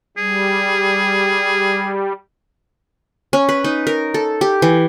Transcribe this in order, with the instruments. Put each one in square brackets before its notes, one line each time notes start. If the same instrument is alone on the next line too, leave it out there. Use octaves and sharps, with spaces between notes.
[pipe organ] G3 [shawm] G#4
[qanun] C#4
B4
D#4
A#4
A4
G4
E3